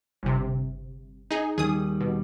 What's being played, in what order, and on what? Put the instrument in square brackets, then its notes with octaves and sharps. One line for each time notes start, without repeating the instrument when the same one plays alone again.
[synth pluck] G1 C3
D#4 G#4
[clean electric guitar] D#2 D#3 G3 [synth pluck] G#4 D#6
[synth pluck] B2